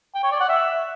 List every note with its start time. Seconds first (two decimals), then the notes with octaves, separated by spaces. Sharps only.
0.15 G5
0.23 C#5
0.32 D5
0.40 F#5
0.49 E5